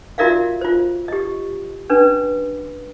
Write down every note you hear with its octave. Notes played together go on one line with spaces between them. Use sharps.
F4 F#4 A#4 D5 E5 F5
F4 C5
G4 D#5
C#4 D4 B4